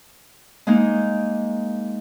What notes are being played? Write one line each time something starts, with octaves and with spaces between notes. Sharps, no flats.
G#3 A#3 D#4